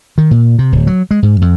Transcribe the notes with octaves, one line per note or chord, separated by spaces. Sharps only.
D#3
A#2
C3
D1
F#3
G#3
G#2
F2